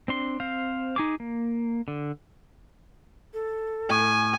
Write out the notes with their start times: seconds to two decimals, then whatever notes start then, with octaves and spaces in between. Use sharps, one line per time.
0.08 C4 D4 C6
0.40 C4 C5 F5
0.96 D#4 G#4 D6
1.20 A#3
1.88 D3
3.34 A4
3.90 A2 G#5